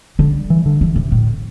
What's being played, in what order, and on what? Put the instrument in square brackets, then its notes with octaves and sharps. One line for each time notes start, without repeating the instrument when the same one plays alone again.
[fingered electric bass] D3 [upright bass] G3
[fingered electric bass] E3
D3
[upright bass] E3
C3
A2